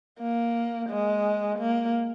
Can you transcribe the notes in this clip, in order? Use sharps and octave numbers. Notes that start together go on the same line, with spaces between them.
A#3
G#3
A#3